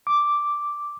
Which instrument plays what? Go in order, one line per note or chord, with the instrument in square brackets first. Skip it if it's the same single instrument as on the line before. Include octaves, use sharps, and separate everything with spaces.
[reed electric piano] D6